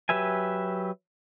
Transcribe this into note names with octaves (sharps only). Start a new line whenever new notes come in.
F#3 G4 B4 E5 G#5